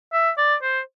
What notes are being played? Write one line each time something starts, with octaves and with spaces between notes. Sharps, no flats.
E5
D5
C5